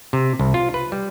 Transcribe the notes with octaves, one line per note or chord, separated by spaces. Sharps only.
C3
C2
F4
B4
G3